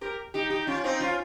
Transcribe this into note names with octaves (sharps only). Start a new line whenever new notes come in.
G4 A#4
D#4 G4
D#4 G4
C#4 F4
C4 D#4
C#4 F4